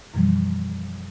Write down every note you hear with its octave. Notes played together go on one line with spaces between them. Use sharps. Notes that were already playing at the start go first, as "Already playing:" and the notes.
F#2 B2 E3 F3 G3